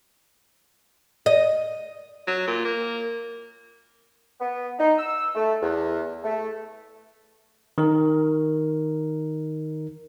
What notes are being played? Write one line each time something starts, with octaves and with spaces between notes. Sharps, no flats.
D#5
F#3
A#2
A#3
B3
D#4
E6
A3
E2
A3
D#3 D#4 A#4